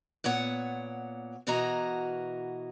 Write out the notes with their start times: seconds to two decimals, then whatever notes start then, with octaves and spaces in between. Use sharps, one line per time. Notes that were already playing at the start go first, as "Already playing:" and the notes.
0.24 A#2 B3 C#5 F#5
1.47 B2 E3 F#4 A#4 D#5 A#5